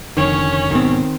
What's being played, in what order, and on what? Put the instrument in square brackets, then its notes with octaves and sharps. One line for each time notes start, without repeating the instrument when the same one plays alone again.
[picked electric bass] F1 F2 D3 [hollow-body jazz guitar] D#3 [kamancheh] C#4 C#5
[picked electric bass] B1 G#2 B3 [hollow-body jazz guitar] D#3 C4